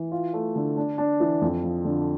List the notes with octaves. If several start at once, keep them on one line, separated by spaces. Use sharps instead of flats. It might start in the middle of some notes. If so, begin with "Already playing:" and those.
Already playing: E3
F4
A3
D3
D4
D4
E3
F2
F3
D3